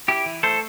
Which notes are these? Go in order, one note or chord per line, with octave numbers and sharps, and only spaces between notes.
E4 G4
E3
A3 A4 C5